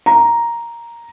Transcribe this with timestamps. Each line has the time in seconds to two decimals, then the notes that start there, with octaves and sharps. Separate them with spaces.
0.06 A#5